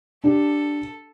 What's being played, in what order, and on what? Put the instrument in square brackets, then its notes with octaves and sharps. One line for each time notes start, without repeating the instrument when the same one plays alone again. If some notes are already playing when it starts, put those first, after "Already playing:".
[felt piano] D4 G4 [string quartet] A4